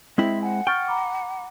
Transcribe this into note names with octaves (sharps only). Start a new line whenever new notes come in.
G#3 C4 E4 C5 E5
F#5 G#5
G5 C#6 F6 A6
A#5 B5 D6